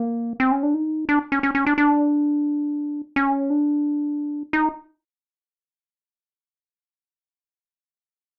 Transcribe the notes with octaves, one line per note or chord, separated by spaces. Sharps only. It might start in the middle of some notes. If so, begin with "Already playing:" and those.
Already playing: A#3
C4
C#4
D4
D#4
D4
C#4
C#4
C#4
D4
D4
C#4
D4
D#4